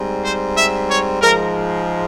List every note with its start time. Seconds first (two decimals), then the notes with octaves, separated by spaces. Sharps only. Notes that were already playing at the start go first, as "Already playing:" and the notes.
Already playing: G#2 G3 C4
0.23 C5
0.56 E5
0.89 C#5
1.21 G#2 F3 G#3 A#4